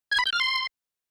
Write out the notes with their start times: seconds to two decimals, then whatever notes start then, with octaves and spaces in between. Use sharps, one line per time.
0.12 G#6
0.19 B5
0.26 G6
0.33 F6
0.40 C6